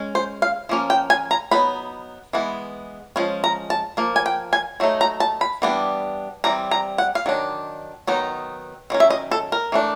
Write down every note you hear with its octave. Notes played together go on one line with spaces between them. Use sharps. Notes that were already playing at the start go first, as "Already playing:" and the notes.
Already playing: G#3 C#4
C5
F5
F3 A#3 C#4
G5
G#5
A#5
F#3 B3 D#4 B5
E3 G#3 B3
F3 G#3 C#4
A#5
A5
F3 A#3
G#5
G5
G#5
F#3 A3 D#4
A#5
A5
B5
E3 G3 B3 D4
E3 G3 C4 A#5
A#5
F#5
F5
D#3 F#3 D4
D#3 F#3 B3 D#4
D#3 F#3 C#4
E5
D#5
A4
A#4
E3 A3 D4